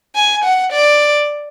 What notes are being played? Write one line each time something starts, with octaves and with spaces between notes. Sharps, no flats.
G#5
F#5
D5